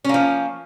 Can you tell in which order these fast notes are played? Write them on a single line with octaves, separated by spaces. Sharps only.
C#4 A#3 F3